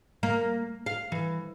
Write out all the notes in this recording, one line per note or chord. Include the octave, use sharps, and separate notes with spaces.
A#3
F5
E3